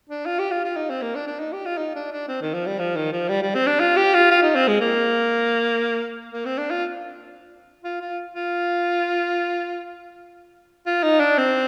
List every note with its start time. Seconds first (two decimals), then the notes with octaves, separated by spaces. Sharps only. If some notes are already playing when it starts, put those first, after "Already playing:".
0.09 D4
0.26 F4
0.39 G4
0.51 F4
0.65 F4
0.76 D#4
0.90 C4
1.02 A#3
1.15 D4
1.27 D4
1.40 D#4
1.53 G4
1.65 F4
1.77 D#4
1.95 D4
2.12 D4
2.29 C4
2.42 D#3
2.54 F3
2.67 G3
2.79 F3
2.96 D#3
3.12 F3
3.29 G3
3.43 G3
3.55 C4
3.67 D4
3.80 F4
3.97 G4
4.14 F4
4.31 F4
4.43 D#4
4.56 C4
4.68 G#3
4.81 A#3
6.32 A#3
6.45 C4
6.58 D4
6.71 F4
7.84 F4
8.01 F4
8.34 F4
10.87 F4
11.03 D#4
11.20 D4
11.38 C4